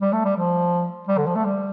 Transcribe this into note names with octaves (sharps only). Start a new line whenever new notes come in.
G3
A3
G3
F3
G3
D3
F3
A3
G3